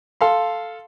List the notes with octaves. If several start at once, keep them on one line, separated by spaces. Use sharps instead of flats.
A4 F5 C6